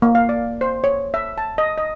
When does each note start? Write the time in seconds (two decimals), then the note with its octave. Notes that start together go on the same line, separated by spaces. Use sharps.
0.02 A#3
0.15 F5
0.29 D5
0.61 C5
0.84 C#5
1.14 E5
1.38 A5
1.58 D#5
1.78 D#5